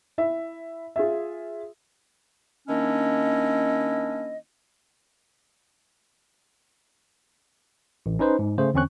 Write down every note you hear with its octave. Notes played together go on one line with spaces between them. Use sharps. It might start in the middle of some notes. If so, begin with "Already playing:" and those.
E4 E5
F4 G#4 E5
D#3 A#3 C#4 D4 E4 D#5
A1
C#4 D#4 B4 C5
G#2
C#3 A3 C5
E2 D3 C4 C#4 C#6 F#6